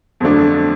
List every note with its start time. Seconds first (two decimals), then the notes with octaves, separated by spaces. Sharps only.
0.20 F2 D3 F#3 A3 D4